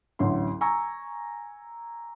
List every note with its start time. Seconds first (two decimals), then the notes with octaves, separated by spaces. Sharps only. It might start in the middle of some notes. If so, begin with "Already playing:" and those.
0.19 A1 D2 F#3 C6
0.61 G#5 A#5 C#6 E6